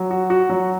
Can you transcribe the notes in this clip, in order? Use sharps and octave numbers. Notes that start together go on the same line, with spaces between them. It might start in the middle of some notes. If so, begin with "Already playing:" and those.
Already playing: F#3
F#4
F#4
F#3